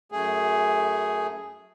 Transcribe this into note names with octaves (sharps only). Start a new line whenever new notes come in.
F#2 A3 G#4